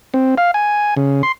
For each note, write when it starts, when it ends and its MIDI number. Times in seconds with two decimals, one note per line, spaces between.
0.14 0.35 60
0.38 0.51 77
0.54 0.94 80
0.97 1.22 49
1.23 1.32 84